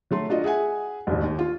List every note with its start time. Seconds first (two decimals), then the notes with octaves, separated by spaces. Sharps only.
0.11 F#3 A3 C6
0.29 D4 F4 F#4 D#5
0.44 G#4 E5 F#5 G#5
1.07 E1 A1 D#2
1.24 D#2
1.39 F4